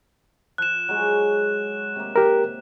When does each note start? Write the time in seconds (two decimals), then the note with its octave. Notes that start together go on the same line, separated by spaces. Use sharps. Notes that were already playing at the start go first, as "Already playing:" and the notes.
0.58 F3 F#6 E7
0.88 F#3 G#3 C#5
1.96 C3 A#3
2.16 G4 A#4